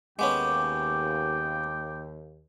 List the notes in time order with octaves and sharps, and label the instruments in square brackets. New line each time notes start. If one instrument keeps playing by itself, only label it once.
[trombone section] D#2 [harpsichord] G#3 B3 C#4 [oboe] G5 [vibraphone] D6